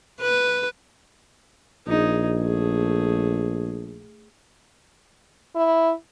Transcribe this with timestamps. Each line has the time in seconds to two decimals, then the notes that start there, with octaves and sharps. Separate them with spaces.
0.21 B4
1.87 A#1 D#4 G#4
2.40 A3 G#4
5.56 E4